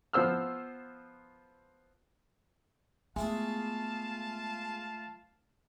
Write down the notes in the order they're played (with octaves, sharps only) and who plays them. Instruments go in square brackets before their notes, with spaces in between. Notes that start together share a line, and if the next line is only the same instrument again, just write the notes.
[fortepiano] F3 B3 C5 E6 F6
[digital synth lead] G#3 [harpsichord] A3 E4 G#4 [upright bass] B3 [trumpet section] F4 F5 A5